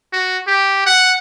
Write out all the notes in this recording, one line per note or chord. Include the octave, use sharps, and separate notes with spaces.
F#4
G4
F#5